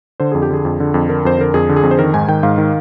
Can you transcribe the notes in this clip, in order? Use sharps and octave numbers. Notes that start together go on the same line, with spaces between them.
D3 C5
F2 G#4
G4
D3 G#4
F2
D3
F2
D3 A#4
F2 C5
D3 A#4
F2 G#4
D3
G#4
F2
C5
D#3 A#4
G#2 G#5
D#3 G5
G#2 F5
D#3